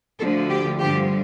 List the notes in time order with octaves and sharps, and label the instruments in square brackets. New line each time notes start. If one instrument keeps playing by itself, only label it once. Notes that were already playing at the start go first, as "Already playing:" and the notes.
[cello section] D2 D3 F3 A4
G4
G2 D3 F3 G4